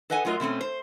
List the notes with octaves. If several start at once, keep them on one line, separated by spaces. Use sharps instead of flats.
A4 B4 D#5 F#5 G#5
F#3 A3 F4 A#4 D#5
B2 A3 C4 C#4
C5